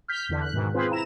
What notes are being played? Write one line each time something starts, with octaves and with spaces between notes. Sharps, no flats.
F6 G6 B6
E2 D3
F#6
G#2 B2 D#3
C4 F4 G#4 B4 C5
E4 A#5 E7